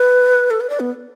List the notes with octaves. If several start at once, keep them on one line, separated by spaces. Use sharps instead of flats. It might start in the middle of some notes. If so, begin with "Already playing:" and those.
Already playing: B4
A4
B4
D5
B3